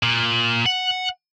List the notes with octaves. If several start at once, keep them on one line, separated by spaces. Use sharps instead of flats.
A#2
F#5